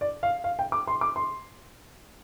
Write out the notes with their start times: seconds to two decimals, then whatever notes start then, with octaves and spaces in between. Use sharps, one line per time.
0.01 D5
0.23 F5
0.44 F5
0.59 G5
0.72 D6
0.87 C6
1.01 D6
1.16 C6